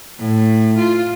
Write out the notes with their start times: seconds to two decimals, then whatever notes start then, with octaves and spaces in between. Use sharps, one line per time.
0.19 A2
0.78 F4